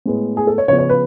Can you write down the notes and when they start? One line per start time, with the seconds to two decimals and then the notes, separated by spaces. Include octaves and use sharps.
0.06 A2 G#3 B3
0.37 G#4
0.47 A4
0.58 C#5
0.68 C#3 F3 B3 C#5
0.78 C#5
0.89 B4